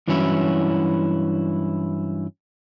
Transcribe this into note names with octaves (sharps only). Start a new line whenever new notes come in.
G2 E3 F#3 C#4 E4 F#4